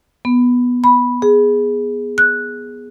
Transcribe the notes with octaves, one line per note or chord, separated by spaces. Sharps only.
B3
B5
G#4
F#6